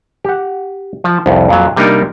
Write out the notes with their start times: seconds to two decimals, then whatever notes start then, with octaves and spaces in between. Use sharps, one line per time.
0.25 G4 F#5
1.04 F3
1.26 C2 F2
1.48 F2 A#2 F#3
1.76 C3 G3 A#3 D4 D#4 A#4